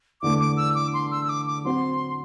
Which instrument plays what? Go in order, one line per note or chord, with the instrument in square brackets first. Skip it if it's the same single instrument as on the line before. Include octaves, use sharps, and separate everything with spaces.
[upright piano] E2 D3 A3 [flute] D6
[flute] D6
E6
D6
C6
E6
E6
D6
D6
[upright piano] F#3 C4 F#4 [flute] C6